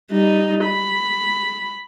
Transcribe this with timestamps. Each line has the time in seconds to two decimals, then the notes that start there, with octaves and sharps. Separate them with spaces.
0.11 G3 D#4
0.65 B5